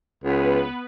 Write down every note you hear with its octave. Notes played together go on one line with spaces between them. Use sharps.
C#2 B3 B4